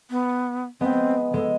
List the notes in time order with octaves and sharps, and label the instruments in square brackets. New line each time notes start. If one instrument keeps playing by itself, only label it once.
[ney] B3
[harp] G#3 B3 [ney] C4
[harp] G#3 [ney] A4